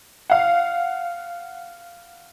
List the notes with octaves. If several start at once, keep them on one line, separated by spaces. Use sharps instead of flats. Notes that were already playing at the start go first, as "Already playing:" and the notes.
F5 F#5